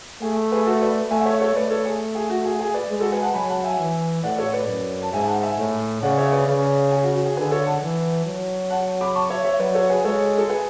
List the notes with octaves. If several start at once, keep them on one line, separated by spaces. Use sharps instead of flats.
A3 G#4
G#4 B4
F#4 A4
B4 D5
A3 E5 G#5
F#5
C#5 E5
A4 C#5
A3 B4 D5
A4 C#5
G#4
G#4
F#4
G#4
G#4
B4 D5
G#3
F#4 A4
G#4 B4
F#5 A5
F#3 G#5 B5
F#5 A5
E5 G#5
E3
A2 D5 F#5
A4 C#5
B4 D5
F#2
A5
G#2 E5 G#5
F#5 A5
E5 G#5
A2
C#3 D5 F#5
C#5 E5
B4 D5
C#3
G#4
F#4
F#4
G#4
D3 G#4 B4
A4 C#5
F#5 A5
E3
F#3
F#5 A5
B5 D6
A5 C#6
C#5 E5
C#5 E5
F#3 B4 D5
A4 C#5
G#4 B4
G#3 A4 C#5
A4
G#4 B4